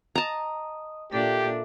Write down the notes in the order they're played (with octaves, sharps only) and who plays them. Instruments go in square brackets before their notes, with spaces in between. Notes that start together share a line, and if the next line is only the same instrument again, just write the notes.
[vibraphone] D#5 D#6 [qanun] A5 A#5
[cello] A#2 D4 [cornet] G4 [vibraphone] A4 E5